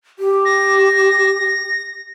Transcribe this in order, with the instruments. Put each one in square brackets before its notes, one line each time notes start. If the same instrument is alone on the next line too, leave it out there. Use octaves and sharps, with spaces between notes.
[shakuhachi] G4
[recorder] A#6